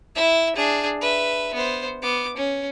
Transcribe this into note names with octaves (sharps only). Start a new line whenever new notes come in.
E4 E5
D4 G#4
B4 E5
B3 C5
B3 D6
C#4